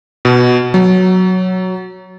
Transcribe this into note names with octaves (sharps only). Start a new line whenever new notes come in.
B2
F#3